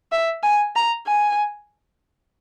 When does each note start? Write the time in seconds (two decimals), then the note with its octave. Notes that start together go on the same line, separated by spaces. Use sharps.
0.12 E5
0.43 G#5
0.76 A#5
1.07 G#5